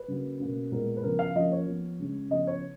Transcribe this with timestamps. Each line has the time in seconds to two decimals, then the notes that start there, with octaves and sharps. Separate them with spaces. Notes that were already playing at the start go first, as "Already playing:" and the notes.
Already playing: B4
0.08 C#3 F#3 A#3
0.40 B2 A#3 C#4
0.72 A#2 G#3 B3 A#4
0.97 B4
1.03 C#3 F3 B3 A#4
1.19 F5
1.35 F3 A#3 C#4 D#5
1.52 C#5
1.68 F3 B3
1.99 C#3 G#3 C#4
2.30 C#3 F3 B3 D#5
2.47 C#5